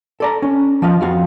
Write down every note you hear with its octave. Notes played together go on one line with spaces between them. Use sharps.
A4 D5 A#5
C#4
F3 F4 D#5 F5
F2 F#4 F5